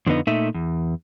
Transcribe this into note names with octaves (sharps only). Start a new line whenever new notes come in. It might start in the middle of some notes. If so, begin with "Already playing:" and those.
F2 D3 F3 B3 D#4
A#2 A3 D#4 E5
E2